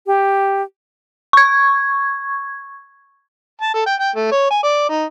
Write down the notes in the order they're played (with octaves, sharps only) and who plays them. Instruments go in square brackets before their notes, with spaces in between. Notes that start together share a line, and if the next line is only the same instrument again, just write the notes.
[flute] G4
[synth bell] C#6 G#6
[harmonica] A5
A4
G5
G5
A3
C#5
G#5
D5
D#4